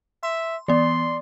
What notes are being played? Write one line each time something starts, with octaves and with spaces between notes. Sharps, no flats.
E5 C6
E3 B3 D5 C6